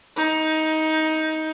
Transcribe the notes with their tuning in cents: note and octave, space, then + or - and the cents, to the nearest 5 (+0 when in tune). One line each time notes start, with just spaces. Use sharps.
D#4 +15